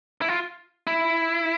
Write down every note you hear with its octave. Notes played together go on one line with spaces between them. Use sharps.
E4
F4
E4